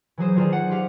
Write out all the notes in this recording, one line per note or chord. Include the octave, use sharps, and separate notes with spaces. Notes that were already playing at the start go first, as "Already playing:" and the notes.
E3 F#3 G#4 C5
D#3 F4 G#4 C5 D5
F#5
F4 G4 F5